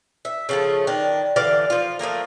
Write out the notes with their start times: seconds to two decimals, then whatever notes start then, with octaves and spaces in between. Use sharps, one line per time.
0.25 E5
0.49 C#3 F3 A3
0.87 D#3 D4
1.36 D3 E3 D5 F5
1.70 F3 F4
1.99 F3 A3 A#3 A#4